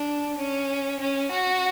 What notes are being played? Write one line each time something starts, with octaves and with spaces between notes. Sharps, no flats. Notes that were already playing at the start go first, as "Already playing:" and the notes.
Already playing: D4
C#4
C#4
F#4